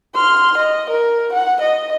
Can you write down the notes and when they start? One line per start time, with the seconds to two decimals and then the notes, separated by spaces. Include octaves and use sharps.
0.15 C6 F6
0.58 D#5
0.91 A#4
1.33 F#5
1.62 D#5